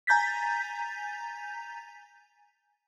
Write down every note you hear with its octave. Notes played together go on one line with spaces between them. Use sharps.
G#5 A#5 G6 A6 B6